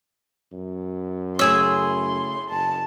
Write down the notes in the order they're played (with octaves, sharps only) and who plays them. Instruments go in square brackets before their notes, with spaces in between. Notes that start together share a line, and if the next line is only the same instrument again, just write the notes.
[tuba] F#2
[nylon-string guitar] C#3 A3 C#5 [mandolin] E4 G#4 E6 [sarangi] C6
[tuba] F#1 [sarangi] A5